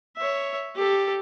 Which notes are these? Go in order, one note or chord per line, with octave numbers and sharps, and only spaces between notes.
C#5 E5
G4 A4